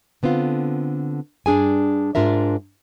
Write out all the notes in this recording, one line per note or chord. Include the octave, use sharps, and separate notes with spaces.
D3 B3 C4 F4
G2 D4 G#4 G#5
G#2 D4 F4 A#4 E5